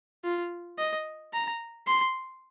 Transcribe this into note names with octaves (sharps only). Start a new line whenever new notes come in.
F4
D#5
A#5
C6